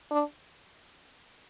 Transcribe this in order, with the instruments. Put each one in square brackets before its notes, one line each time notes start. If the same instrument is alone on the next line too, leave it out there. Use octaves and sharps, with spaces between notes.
[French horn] D4